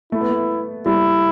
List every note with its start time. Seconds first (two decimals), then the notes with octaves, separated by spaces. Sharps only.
0.12 A3 E4
0.21 B3
0.29 A3
0.86 G3 E4